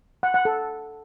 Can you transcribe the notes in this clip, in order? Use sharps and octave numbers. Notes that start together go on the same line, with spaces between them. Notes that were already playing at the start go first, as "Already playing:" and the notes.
F#5
F#5
A4